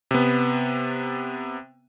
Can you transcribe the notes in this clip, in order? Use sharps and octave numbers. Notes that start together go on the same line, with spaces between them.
C3 B3